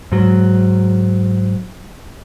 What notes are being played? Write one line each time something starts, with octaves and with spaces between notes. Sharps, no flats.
G#2 F#3